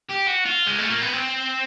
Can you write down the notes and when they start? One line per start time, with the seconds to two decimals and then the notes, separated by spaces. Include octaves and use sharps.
0.10 G4
0.28 F#4
0.45 F4
0.66 G#3
0.78 A3
0.90 A#3
1.01 B3
1.13 C4